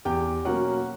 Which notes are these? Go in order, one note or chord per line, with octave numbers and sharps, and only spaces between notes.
E2 G4 G5
B2 F#3 A#3 C#4 F#4 F#5